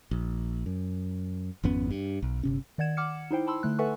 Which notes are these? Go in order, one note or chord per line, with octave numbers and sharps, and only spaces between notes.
A#1
F#2
G#1 F2 B3 C#4
G2
B1
G1 C3 C#4
D#3 D5 F#5 G#6 E7
F#5 D6 F6 C#7
D#4 E4 C5 G5
A5 B5 C6 E6
D3 A3 F#6
A4 B4 E5 F#5 G#5 C#6